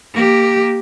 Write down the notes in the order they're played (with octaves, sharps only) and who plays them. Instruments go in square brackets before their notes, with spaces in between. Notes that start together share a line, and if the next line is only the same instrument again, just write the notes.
[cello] A#3 G4